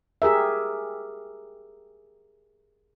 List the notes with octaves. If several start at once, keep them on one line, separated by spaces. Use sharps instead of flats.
G4 G#4 A#4 E5